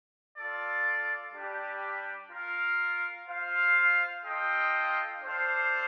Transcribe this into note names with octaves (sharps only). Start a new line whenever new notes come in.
F4 A4 D5
G3 D4 G4
F4 A#4 F5
F4 C5 F5
F4 A4 D#5 G5
D4 A4 C5 F5